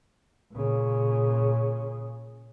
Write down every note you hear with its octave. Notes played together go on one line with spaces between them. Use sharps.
A#2 C#3